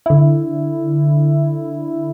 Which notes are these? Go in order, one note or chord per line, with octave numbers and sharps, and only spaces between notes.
D3 E4